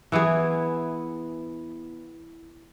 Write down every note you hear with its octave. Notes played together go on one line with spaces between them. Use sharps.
E3 B3 E4 G#4